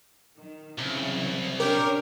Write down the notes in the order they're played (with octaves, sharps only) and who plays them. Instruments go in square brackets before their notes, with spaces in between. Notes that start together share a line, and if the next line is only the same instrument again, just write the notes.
[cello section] D#3
[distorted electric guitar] C2 [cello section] C#3 E3 F#3
[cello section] C#4 D4 C#5 [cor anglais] G4 [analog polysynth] A#4